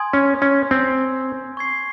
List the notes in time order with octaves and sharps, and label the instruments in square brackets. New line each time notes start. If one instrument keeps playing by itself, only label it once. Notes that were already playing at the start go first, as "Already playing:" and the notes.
Already playing: [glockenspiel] G#5 C6 D#6 G#6
[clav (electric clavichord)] C#4
C#4
C4
[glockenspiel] C#6 G#6 C7